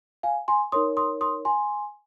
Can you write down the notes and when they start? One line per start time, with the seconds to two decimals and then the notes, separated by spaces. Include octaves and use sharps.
0.23 F5 G#5
0.48 G#5 C6
0.72 D#4 A#4 C#5 C6 D#6
0.97 C6 D#6
1.21 C6 D#6
1.45 G#5 C6